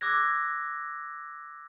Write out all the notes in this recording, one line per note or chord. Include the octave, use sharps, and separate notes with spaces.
D6 E6 F#6 G#6 A#6